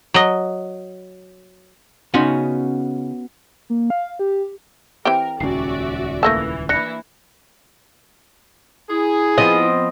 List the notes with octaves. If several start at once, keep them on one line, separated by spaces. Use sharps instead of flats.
F#3 D#5
C#3 B3 C#4 D#4 F#4 C6
A#3
F5
G4
E3 C4 G4 A#4 G5
D#1 C#2 C#4 F#4 D5 E5 C7
E3 A3 A#3 A5 E6 A#6
E3 A#3 D4 E4 F#6 A#6 C#7
E4 G#4
F3 B3 C4 D#5